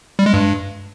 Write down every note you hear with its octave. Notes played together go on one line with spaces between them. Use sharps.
G3
G#3
G2